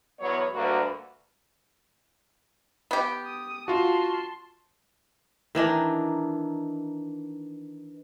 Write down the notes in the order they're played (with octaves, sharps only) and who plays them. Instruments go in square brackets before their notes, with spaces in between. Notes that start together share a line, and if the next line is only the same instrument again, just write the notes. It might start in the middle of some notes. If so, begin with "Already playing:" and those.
[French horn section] E2 F#3 B3 C#5
D2 G2 A#3 F#4 B4 D5
[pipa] B3 G4
[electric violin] D#6
[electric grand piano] F4 F#4 [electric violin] A5 C6
[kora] D#3 E3 D4 D#4